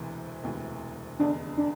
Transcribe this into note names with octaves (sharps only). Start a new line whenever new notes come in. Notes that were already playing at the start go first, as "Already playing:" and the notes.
Already playing: E1 D2 C3 E3
E1 D2 C3 E3
F1 E2 D3 D4
D4